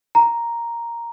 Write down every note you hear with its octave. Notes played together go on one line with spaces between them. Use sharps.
A#5